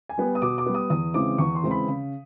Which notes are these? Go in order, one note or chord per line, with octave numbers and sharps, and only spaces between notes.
G#5
G3 B3
D#6
B2 D6
D6
G3 B3
D#6
E2 D#6
C#3 E3 G#3 C4 D6
E2 C#6
C6
C#3 E3 G#3 C4
B5
C#3